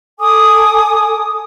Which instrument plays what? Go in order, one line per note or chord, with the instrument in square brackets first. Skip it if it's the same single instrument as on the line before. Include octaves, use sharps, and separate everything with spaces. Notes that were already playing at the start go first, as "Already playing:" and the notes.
[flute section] A4 G#5 D6 D#6